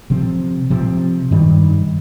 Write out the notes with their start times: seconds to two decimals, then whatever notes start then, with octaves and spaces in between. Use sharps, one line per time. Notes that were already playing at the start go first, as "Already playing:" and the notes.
0.10 C3 F3 C4
0.70 C3 F3 C4
1.31 G2 D#3 G3